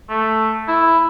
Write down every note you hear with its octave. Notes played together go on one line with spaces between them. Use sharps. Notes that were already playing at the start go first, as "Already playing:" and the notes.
A3
E4